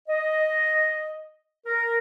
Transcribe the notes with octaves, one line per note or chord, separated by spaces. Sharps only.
D#5
A#4